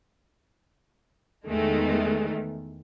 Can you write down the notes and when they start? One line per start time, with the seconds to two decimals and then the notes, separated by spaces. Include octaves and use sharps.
1.46 E2 D#3 G#3 A3